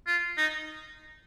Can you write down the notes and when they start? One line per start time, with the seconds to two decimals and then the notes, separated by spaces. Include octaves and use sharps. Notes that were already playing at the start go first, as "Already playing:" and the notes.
0.07 F4
0.37 D#4